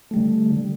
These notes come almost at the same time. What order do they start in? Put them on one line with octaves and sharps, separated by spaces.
A3 G3 D3